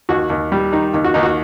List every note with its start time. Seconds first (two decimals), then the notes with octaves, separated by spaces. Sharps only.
0.09 D#2 F#4
0.30 D#2
0.52 G3
0.73 D#3 D#4
0.94 D#2
1.04 F#4
1.14 D#2 D#4
1.23 F#4